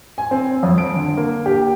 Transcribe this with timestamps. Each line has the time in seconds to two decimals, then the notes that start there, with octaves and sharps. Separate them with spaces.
0.18 G#5
0.31 C4
0.63 F2
0.78 D7
0.95 D3
1.17 A#3
1.46 G4